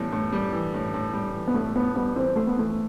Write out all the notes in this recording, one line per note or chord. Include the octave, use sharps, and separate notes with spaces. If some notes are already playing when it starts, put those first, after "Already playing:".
Already playing: A2 E3 G3 B3
A2
G3
E3
A2
A2
G3
E3
B3
A2 A3
A2 B3
G3 B3
E3 C4
A3 C5
B3
E3 A3